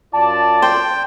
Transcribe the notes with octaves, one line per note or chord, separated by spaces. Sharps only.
F#2 F4 D5 A5
C5 G5